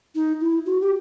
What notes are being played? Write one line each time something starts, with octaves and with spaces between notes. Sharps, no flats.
D#4
E4
F#4
G4